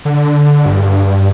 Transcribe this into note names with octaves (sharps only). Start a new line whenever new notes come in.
D3
G2